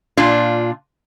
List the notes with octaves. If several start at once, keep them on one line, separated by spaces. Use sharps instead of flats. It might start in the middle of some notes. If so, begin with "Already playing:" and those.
A#2 D4 F4